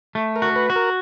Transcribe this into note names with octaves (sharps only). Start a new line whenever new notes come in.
A3
A#4
F#4
B4
F#4
A#4